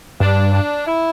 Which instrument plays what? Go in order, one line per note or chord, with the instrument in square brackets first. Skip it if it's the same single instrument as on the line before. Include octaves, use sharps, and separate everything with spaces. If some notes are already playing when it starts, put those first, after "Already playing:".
[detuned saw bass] G2 [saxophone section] D4
[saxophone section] D4
E4